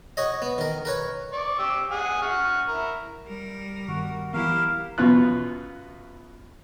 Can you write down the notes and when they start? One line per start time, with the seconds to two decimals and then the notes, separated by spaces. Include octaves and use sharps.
0.17 F#4 C#5 D#5
0.42 B3
0.58 D#3 A#4
0.85 A#4 B4 C#5
1.33 D5 C#6 D6
1.59 G4 E6
1.91 G#4 F#5 G#5
2.22 F#5 C#6 F6
2.68 E4 A#4
3.27 G3 A#4
3.88 G1 D#3 F#4
4.34 E3 F#3 B3 E4 G4 A#4 F5
4.98 F#2 B2 B3 F4 F#6